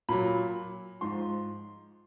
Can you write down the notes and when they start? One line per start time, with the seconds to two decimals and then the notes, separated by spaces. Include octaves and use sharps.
0.09 A#2 F#3 B5
1.01 G#2 F3 C6